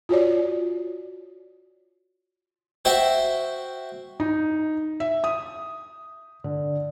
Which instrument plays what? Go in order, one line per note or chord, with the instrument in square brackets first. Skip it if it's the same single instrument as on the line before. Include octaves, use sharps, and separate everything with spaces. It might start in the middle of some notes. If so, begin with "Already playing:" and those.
[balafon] F4 F#4 C#5 D5
[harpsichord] F#4 C5 E5 G5
[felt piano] D#4
E5
D#6
D3